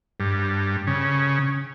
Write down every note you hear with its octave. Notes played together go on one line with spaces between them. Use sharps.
G2
C#3